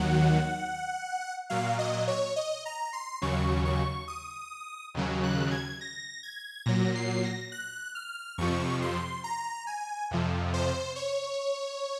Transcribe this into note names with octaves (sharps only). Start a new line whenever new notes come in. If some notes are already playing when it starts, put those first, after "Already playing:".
Already playing: D#2 D#3 F#3 F#5
A#2 F#3 F5
D#5
C#5
D#5
A#5
C6
D#2 C#3 F#3 C#6
C#6
D#6
D#2 C#3 F#3
F#6
G#6
A#6
G#6
A#2 F#3 A#6
C7
A#6
F#6
F6
F2 C3 F3 C#6
C6
A#5
G#5
F2 C3 F3
C5
C#5